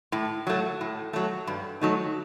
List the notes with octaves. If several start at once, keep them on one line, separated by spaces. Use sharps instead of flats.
A2
F#3 A3
A2
F#3 A3
G2
F#3 A3 D#4